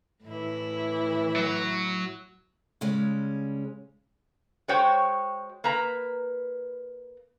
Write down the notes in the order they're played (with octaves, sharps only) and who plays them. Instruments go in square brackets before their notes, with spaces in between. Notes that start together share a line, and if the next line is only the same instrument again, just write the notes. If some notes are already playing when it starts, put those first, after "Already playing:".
[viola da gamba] A2 E4 [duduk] E3
[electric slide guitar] F#3
[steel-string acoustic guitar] C#3 G3 G#3 C#4
[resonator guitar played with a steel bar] G#3 F#4 C5 C#5 G5
A#3 B4 A#5